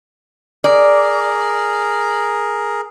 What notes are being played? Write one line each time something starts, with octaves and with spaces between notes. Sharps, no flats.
G#4 A#4 D5